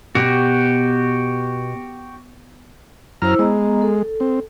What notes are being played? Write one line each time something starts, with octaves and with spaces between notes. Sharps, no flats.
B2 F#4 G4
F#2 E4 C5 A#5 E6 F6
G#3 B3 D#5 A#5
A4
C4